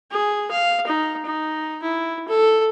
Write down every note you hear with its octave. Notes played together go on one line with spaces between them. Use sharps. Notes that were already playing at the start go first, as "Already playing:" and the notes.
G#4
F5
D#4
D#4
E4
A4